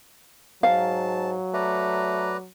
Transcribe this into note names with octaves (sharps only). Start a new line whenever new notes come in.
G#2 F#3 F5 A5
A3 B4 D5 A#5